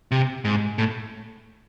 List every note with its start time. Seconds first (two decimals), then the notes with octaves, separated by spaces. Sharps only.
0.11 C3
0.45 G#2
0.78 A2